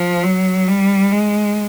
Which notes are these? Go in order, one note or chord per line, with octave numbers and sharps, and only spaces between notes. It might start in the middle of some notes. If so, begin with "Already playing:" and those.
Already playing: F3
F#3
G3
G#3